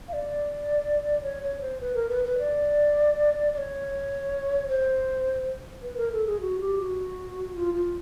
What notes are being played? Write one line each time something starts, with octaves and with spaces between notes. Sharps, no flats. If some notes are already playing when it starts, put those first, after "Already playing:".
F5
D5
C#5
C#5
C5
B4
A#4
B4
B4
D5
D5
C#5
C5
B4
A#4
A4
G#4
F#4
G4
F#4
F4
F4